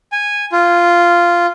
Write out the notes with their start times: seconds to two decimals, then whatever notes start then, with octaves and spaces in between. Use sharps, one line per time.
0.12 G#5
0.52 F4